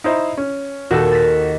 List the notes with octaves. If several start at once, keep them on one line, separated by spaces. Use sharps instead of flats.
D#4 E4 C5
C#4
D#2 A#2 D#3 F#4 A4
A6 B6